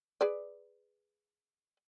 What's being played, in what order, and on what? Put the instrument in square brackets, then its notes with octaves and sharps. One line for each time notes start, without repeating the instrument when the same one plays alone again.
[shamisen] G#4 B4 D5